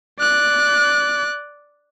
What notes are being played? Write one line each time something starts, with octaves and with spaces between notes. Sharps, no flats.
D5 F#6